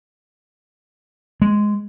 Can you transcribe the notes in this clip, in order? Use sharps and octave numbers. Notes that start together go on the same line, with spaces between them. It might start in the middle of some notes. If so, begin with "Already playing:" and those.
G#3